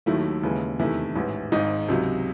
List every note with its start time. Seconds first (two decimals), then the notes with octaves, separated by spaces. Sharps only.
0.06 D#2 D#3 F#3 A3 E4
0.43 D#2 C#3 E3 G#3
0.79 E2 C3 D#3 A3 E4
1.16 A1 G#2 E3
1.52 G#1 G#2 D#3 D#4
1.88 C#2 C3 F#3